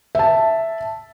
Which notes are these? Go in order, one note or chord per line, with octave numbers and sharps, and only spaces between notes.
E5 A5